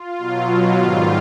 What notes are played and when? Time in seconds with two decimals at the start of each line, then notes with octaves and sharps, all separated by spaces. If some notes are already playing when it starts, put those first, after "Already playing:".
Already playing: F4
0.18 B2 F#3
0.48 F4
0.77 G#2 D#3 G3 F4